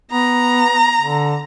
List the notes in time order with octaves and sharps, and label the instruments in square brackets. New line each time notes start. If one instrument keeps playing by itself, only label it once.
[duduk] B3 [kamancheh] A#5
[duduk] D3